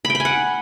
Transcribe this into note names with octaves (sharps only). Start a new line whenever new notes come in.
B5
G5
B5
G#5
F#5